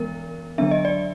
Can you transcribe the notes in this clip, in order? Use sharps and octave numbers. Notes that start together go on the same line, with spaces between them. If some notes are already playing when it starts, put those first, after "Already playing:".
Already playing: E3 G#3 B3 A#4
D3 F#3 B3 D4 E5
D#5
D5